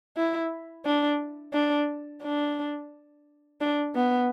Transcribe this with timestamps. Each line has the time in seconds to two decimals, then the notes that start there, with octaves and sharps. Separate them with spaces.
0.17 E4
0.85 D4
1.54 D4
2.23 D4
3.61 D4
3.95 B3